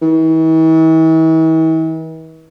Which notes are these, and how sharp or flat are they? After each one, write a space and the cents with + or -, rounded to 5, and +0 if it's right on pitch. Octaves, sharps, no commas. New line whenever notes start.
E3 -45